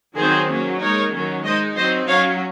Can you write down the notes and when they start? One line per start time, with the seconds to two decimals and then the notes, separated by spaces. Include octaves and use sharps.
0.17 D#3 F#3 C4 D#4 G#4 C5
0.49 F#3 A#3 C#4
0.80 G#3 D#4 A#4 C#5
1.12 D#3 F#3 C#4
1.44 G#3 D#4 C5 D#5
1.76 F#3 C4 D#4 C5 D#5
2.08 F#3 C#4 C#5 F5